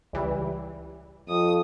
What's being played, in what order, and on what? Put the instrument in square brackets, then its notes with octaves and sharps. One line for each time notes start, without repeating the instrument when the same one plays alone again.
[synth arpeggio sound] C#2 E3 G3
[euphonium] F2 [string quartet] D#6